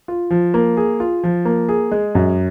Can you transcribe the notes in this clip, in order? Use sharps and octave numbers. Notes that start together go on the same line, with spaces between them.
F4
F3
A#3
G#4
F4
F3
A#3
G#4
G#3
F#2